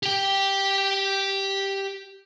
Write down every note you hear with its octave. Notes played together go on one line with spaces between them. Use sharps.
G4 G5